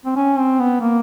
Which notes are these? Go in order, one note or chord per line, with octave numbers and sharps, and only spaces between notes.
C4
C#4
C4
B3
A#3